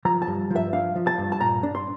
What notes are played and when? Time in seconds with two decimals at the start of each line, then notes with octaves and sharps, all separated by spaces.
0.05 F3 A#5
0.22 A5
0.27 G2
0.50 F3
0.56 E5
0.73 D4 F5
0.96 F3
1.07 A5
1.18 G2
1.32 A5
1.40 A#2 A#5
1.63 D4
1.75 C6